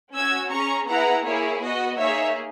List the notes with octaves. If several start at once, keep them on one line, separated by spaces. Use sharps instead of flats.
C#4 F#4 E6 G#6
C#4 G#4 A#5 C#6
B3 E4 G#4 F#5 A#5
A#3 E4 G#4 C#5
B3 F#4 D#5
A#3 D#4 G#4 C#5 E5